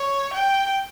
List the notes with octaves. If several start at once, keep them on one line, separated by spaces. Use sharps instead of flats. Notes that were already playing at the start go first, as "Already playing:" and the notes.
Already playing: C#5
G5